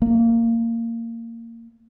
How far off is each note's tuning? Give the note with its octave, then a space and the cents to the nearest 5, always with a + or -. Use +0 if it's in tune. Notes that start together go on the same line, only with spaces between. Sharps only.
A#3 -20